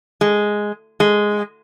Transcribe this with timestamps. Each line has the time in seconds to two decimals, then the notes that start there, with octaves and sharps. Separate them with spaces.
0.21 G#3
1.00 G#3